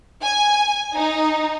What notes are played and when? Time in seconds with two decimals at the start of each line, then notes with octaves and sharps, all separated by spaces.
0.22 G#5
0.95 D#4